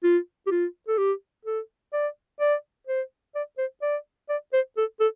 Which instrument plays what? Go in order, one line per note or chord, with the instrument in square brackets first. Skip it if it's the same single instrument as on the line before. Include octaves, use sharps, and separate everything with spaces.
[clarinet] F4
G4
F4
A4
G4
A4
D5
D5
C5
D5
C5
D5
D5
C5
A4
A4